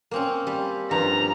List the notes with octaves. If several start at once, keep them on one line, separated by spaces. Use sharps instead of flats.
A#3 C4 C#4
G3
G2 F3 A#5